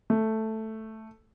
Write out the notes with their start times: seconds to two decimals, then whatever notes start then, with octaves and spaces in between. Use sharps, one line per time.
0.10 A3